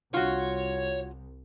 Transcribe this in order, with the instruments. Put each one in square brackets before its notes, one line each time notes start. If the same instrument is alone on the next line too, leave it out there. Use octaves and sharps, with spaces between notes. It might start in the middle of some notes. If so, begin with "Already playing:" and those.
[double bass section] C2 [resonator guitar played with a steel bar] F4 F#4 [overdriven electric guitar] C#5